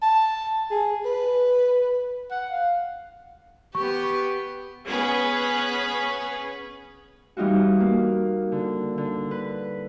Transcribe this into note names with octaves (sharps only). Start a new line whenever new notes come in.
A5
G#4
B4
F#5
F5
B3 G4 C#6
B3 C#4 G#4 B4
E3 G3 D#4 F4 F#4
A#3
D3
D3
B4